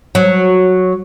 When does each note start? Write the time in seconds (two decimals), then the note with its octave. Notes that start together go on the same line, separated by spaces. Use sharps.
0.15 F#3